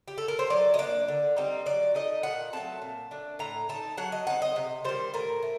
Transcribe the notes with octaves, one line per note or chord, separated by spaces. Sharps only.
G4
A4
A#4
C5
F#3 D5
D#5
A#3 D4 D5
D3
G3 C4 D#4
F#3 D5
A3 D#4 D#5
A#2 F#5
F#3 A3 C4 A5
A#2
A3 D4
A2 A#5
A3 D#4 A5
F#3 F#5
D#5
C4 D#4 F#5
D#5
C3
D#3 G3 C5
A2 A#4
A3